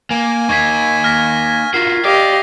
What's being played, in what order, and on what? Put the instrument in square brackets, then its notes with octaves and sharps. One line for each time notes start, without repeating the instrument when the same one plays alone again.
[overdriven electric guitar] A#3 [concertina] G#5
[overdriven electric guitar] A#3 D#4 [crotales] C#6 G#6 B6
[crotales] F6 A#6 B6
[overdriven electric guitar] F4 F#4 [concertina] A#4 [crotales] C7
[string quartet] G4 D#5 F5 [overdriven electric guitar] D5